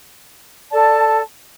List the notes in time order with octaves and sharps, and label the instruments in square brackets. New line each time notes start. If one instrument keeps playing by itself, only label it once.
[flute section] A4 D5 A5